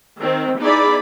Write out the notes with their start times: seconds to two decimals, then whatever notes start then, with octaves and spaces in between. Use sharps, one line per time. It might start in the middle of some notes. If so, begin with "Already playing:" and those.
0.20 D#3 C4
0.59 B3 D#4 E4 G#4 D5 B5